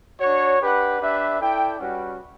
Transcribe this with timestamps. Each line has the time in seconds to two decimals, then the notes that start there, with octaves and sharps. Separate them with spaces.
0.21 D4 F#4 C#5
0.60 D4 G4 B4 F#5
1.00 D4 G4 B4 E5
1.40 E4 A4 D5 G5
1.79 G3 C#4 F#4 B4 F#5